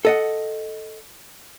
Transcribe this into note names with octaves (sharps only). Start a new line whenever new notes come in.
A4 D#5 F#5